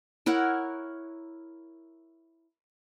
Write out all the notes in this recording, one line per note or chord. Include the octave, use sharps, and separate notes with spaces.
E4 A#4 C#5 F#5